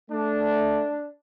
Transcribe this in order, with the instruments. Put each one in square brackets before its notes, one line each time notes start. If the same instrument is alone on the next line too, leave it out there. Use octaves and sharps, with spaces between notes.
[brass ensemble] A3 [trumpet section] D4